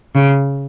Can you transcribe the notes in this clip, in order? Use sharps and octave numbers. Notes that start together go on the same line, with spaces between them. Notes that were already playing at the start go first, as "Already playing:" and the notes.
C#3